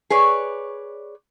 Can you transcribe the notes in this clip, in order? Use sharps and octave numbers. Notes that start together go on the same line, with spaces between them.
G#4 B4 C#5 D5